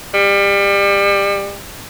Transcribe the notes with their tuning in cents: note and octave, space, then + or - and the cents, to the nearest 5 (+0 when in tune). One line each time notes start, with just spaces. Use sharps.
G3 +30